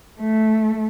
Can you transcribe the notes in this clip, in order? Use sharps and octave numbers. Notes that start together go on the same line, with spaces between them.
A3